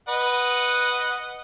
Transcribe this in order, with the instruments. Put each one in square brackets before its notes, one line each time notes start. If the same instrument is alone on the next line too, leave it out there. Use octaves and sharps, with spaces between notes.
[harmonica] B4 D#5 F#5